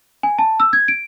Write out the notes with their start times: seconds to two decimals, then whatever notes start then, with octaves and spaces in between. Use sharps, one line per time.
0.23 G#5
0.39 A5
0.60 E6
0.73 G#6
0.88 D7